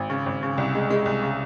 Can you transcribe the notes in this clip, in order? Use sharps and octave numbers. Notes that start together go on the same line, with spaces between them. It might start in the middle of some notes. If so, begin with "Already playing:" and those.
Already playing: G#1
C#3
G#1
C#3
C2
G#3
G#3
C2
C#3